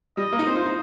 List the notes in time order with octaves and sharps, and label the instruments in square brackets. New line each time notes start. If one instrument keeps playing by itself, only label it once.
[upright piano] G3 [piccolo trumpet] D#5
[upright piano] A#3
D#4
[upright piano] C4 [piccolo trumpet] C5
[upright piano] F4
D#4